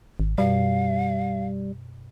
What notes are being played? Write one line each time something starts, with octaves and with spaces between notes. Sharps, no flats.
G#1
F#2 B2 G3 F5